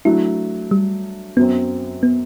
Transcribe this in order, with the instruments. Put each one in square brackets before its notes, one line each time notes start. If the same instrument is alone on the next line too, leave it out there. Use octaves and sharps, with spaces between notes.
[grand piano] F#3 A3 D4 [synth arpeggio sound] E4
[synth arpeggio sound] G3
[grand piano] F#2 F#3 C4 [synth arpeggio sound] B3
[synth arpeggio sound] B3